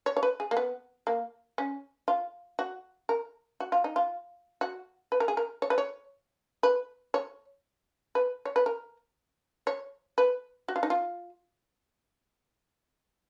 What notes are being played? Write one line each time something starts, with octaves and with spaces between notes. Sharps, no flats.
C#5
C#5
B4
G#4
A#3
B3
A#3
C#4
F4
F#4
A#4
F#4
F4
D#4
F4
F#4
B4
A#4
G#4
A#4
C#5
B4
C#5
B4
C#5
B4
C#5
B4
A#4
C#5
B4
F#4
F4
D#4
F4